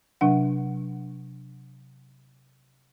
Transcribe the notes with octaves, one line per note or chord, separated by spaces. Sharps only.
C3 F#3 D4 F#5